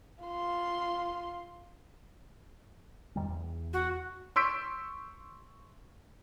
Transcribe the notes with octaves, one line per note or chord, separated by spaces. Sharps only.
F4 C6
F2 D#3 G3
E2
F#4
C6 C#6 E6 G6 B6 D7